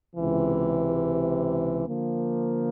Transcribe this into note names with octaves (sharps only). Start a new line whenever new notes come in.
C#2 C3 E3
D3 F3 A#3